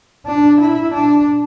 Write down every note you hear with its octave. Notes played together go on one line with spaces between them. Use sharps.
D4
E4
D4